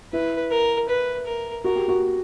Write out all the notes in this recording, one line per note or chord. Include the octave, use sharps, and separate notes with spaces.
E4 B4
A#4
B4
A#4
F#4 A#4
G4
F#4